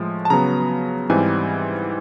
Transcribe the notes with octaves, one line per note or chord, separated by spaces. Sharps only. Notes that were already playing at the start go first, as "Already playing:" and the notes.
Already playing: A2 F3 G#3
A5
C#3 F#3 B3 A#5
G#2 E3 G3 C4 G#5